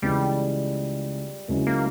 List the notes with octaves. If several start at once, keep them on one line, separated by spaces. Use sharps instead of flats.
C#2 C#3 E3 G3 B3
C#2 C#3 F#3 A#3 C#4 E4
A#3